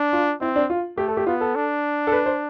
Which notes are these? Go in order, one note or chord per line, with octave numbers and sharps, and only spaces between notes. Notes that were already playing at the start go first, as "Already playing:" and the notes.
Already playing: D4
F4
C4 E4
D4
F4
A3 G4
A4
G4
B3 F4
A4
D4
A4
B4
C5